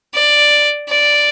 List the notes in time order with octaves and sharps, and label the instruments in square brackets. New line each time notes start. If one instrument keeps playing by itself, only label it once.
[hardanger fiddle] D5
D5